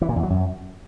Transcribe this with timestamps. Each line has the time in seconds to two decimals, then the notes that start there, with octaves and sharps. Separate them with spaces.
0.02 E3
0.09 A#2
0.16 E2
0.23 F#3
0.30 F#2